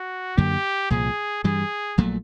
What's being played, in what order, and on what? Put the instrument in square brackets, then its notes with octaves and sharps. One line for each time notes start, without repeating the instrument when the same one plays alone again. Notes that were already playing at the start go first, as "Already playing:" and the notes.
Already playing: [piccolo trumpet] F#4
[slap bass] F#2 D3 F#3 A#3 [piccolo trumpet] G4
[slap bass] C2 A#2 F3 [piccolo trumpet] G#4
[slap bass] G2 E3 G3 [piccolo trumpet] G#4
[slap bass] A#1 A#2 F#3 A3